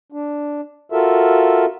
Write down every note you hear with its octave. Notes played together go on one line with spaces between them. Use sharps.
D4
F4 F#4 A4 A#4 E5